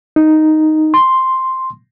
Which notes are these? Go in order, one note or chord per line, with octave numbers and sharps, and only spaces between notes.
D#4
C6